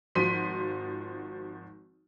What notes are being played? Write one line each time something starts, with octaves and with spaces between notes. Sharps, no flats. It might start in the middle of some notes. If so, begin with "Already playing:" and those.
G#1 F3 F#4 C6 B6 D#7